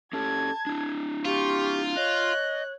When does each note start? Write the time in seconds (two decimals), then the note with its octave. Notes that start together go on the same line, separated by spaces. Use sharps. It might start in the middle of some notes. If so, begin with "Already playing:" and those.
0.13 C#4 G4 A4 A5 G#6
0.67 D4 E4
1.25 F4 G4 C#6
1.97 C#5 D#5 F#6